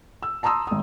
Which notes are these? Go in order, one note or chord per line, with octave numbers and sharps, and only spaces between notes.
E6
A5 A#5 C6 D#6 E6
G#1 D#6